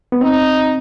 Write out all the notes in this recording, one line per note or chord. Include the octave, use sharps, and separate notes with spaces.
B3
C4 D#4